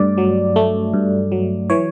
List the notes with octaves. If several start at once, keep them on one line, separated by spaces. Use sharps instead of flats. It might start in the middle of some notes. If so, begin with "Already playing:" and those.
Already playing: G2 A3 D5
F#3
A3
G2
F#3
E3 C#5